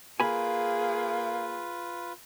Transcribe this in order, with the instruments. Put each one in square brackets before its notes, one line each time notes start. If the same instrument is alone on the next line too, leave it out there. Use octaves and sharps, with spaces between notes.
[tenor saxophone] A#3 [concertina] F4 B4 [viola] G#4 [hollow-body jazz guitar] G#5 B5